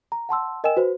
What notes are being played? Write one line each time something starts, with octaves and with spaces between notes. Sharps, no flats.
A#5
F#5 A5 C6 E6
A#4 D#5 G5 G#5 E6 E7
F#4 B4 C5